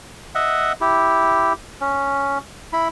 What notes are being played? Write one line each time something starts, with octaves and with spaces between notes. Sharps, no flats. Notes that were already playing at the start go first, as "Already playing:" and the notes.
D#5 E5 F#5
E4 G4
C#4
E4 B5